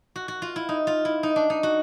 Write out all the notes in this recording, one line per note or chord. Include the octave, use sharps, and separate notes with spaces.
F#4
F#4
F4
E4
D#4
F4
E4
D#4
D4
D#4
F#4